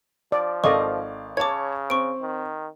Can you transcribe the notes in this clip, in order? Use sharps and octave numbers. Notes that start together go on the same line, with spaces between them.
F3 D5
G#1 A4 D5 D#5 F5 C#6
C#3 C#5 A5 D6 G#6
C4 C#6 D7
D#3